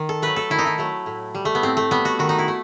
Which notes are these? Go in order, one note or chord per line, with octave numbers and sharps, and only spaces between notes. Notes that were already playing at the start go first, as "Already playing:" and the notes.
Already playing: D#3
A4
F#3 A3 B4
A4
D#3 E4
D#4
E4
F#3 A3
A2
G3
A3
B3
A2 C4
A3
G3 B3
F#4
D#3 F#4
D#4
E4
A3